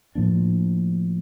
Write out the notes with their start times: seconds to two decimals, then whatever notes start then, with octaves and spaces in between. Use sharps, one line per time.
0.15 A2 F3 A#3 D4